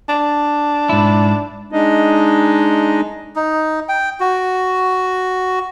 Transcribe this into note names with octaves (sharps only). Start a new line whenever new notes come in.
D4
G#2 E4
G#3 D4 D#4 D#5
D#4
G5
F#4